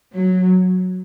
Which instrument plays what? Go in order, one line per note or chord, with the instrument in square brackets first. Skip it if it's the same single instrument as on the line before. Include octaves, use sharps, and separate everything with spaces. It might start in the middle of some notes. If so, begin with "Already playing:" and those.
[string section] F#3